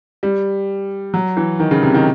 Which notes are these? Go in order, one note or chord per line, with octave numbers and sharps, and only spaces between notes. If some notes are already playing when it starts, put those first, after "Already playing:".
G3
F#3
E3
D#3
C#3
C3
D#3